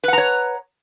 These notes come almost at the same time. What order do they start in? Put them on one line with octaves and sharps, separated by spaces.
B4 F#5 A#5 C#5